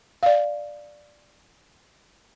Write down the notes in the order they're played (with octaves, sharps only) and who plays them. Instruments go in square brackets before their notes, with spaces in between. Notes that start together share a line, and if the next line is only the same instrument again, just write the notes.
[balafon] D5 F5